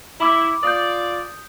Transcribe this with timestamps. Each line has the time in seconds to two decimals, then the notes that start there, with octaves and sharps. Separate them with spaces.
0.20 E4 B5 D6
0.63 F4 D5 D#6 G6